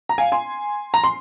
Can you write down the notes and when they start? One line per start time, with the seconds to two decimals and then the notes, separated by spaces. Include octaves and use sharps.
0.09 A#5
0.18 F5 G#5
0.32 G#5 C6
0.94 A#5
1.04 C6